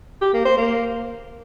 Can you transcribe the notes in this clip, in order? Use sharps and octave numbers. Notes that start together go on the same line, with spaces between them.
G4
A#3
C5
A#3